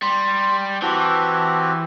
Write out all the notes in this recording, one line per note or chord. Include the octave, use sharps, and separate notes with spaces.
G3 C6
E3 C4 F#4 G4 A5